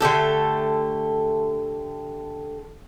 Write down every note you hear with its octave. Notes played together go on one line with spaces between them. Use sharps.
D3 A3 G4 A4